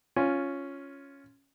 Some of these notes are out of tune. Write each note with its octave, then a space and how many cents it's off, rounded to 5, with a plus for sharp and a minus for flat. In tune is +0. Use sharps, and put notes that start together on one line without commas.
C#4 +0 F4 +0